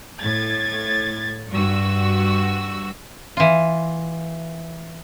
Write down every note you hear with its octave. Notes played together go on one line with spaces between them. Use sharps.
A2 G#6 A6
G2 F#4 E6
E3 F4